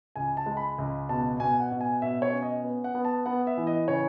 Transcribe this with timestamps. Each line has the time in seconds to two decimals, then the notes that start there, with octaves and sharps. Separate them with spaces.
0.16 C#2 G#5
0.37 A5
0.46 G#3
0.57 B5
0.78 C#2
1.09 B2 A5
1.39 B2 G#5
1.60 F#5
1.71 B2
1.81 G#5
2.02 B2 E5
2.22 C#5
2.33 C#4
2.43 D#5
2.64 B3
2.84 F#5
2.95 B3
3.05 A5
3.26 B3 F#5
3.47 E5
3.57 E3
3.67 D#5
3.88 C#3 C#5